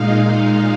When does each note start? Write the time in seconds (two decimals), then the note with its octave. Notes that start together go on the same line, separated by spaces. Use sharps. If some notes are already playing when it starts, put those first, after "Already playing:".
Already playing: A#2 G#3 D#4 F5
0.16 F5